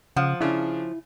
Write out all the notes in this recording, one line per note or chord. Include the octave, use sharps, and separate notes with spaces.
C#3 F3 F#5
C#3 D4 E4